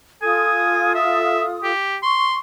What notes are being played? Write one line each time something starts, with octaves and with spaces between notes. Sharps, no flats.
F4 A4 G#5 D#6
E5
G4
C6 C#6